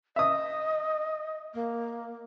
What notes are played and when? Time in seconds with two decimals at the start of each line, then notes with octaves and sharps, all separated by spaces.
0.16 D#5 E5 D#6
1.54 A#3